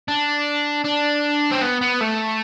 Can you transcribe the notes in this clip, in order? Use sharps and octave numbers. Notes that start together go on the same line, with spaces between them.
D4
D4
C4
B3
B3
A3